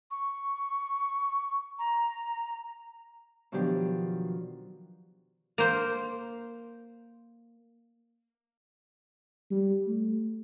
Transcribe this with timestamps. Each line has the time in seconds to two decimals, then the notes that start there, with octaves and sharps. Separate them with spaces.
0.11 C#6
1.79 A#5
3.52 B2 D#3 F3 F#3 D4 G4
5.58 A#3 C5
9.51 G3
9.87 A3